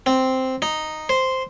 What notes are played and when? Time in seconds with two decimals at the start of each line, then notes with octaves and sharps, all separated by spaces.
0.06 C4
0.62 D#4
1.09 C5